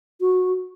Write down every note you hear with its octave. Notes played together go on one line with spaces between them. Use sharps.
F#4